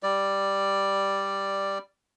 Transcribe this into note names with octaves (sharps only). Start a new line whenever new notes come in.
G3 D5